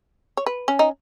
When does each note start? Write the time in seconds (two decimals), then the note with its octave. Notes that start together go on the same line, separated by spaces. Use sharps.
0.37 C#5
0.46 B4
0.68 C#4
0.79 D#4